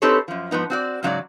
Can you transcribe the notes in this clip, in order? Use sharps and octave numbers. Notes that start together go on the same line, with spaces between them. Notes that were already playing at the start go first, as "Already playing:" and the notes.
C4 D#4 G4 A4 B4 C#5
F#2 F3
G#2 F3 B3 D#4
C4 F#4 D5
G#2 C#3 F#3 C#4 F#4 D5